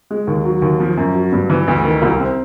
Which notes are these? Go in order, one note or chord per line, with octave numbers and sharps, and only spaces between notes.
G#3
D#2
F#3
D#2
F3
F#2
F#3
G2
E3
D2
D#3
C2
C4